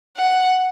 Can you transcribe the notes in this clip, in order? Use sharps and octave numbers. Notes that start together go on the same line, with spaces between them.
F#5